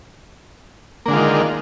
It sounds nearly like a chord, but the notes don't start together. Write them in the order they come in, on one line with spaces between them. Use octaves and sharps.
A#3 D3 G#3 F4 D#3